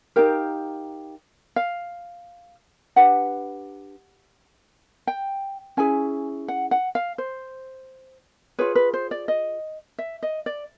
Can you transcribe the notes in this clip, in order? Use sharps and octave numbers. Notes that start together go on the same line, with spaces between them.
D#4 G4 A#4 F5
F5
D4 G4 B4 F#5
G5
C#4 E4 G#4 G#5
F#5
F#5
F5
C5
F4 G#4 B4 C#5
B4
C5
D5
D#5
E5
D#5
D5